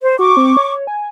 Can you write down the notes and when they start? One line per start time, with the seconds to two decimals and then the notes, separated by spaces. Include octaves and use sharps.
0.02 C5
0.19 F#4 C#6 D6
0.37 C4
0.57 C#5
0.87 G#5